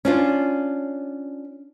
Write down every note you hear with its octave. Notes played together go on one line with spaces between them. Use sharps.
C#4 D4 F4